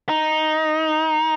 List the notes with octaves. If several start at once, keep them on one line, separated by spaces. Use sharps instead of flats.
D#4